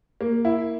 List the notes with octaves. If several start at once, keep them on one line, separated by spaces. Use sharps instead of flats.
A#3
E4